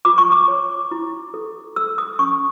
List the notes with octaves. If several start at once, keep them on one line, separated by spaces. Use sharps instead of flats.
F4 D6
C#6
D6
C#5
E4
A4
A4 E6
D#6
C#4 C#6